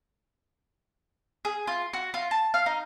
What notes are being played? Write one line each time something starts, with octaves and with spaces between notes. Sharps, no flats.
G#4
F4
F#4
F4
A5
F5
D#4